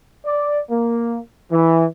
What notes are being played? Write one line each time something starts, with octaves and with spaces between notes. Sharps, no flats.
D5
A#3
E3